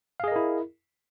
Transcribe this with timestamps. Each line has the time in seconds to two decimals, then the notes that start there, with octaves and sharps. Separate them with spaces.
0.20 F5
0.24 G#4
0.28 D#5
0.32 A#4
0.36 E4